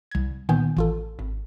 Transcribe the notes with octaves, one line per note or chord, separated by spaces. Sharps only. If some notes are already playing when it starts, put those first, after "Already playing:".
C2 G#6
A#2 D#3 B3 G#5 G6
A1 F4 A4
G#1